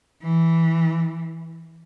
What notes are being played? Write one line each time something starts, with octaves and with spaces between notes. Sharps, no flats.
E3